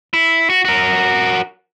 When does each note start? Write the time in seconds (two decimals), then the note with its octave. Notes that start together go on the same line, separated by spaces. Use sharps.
0.14 E4
0.50 F#4
0.65 F#4 A#4